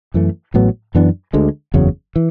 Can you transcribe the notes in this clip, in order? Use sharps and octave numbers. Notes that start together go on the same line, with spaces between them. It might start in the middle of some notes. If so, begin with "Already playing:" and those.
F#2 E3 A3
A1 A2 F#3 B3
F#2 E3 B3 D4
D2 D3 G#3
F#1 E2 C#3 F#3
E3